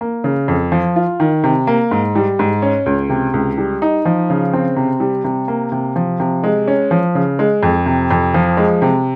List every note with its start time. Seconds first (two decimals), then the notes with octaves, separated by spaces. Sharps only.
0.01 A#3
0.24 C#3
0.48 F2
0.72 F3
0.96 F4
1.20 D#3
1.44 C3
1.67 A#3
1.91 G#2
2.16 G3
2.39 G#2
2.62 C#4
2.86 C#2
3.10 C3
3.34 C#2
3.58 G3
3.82 D#4
4.05 F3
4.30 C#3
4.53 C4
4.77 C3
5.00 G3
5.24 C3
5.48 A#3
5.72 C3
5.96 F3
6.20 C3
6.44 G#3
6.68 C#4
6.91 F3
7.15 C#3
7.39 G#3
7.63 F2
7.86 C3
8.11 F2
8.34 F3
8.57 G#3
8.82 C3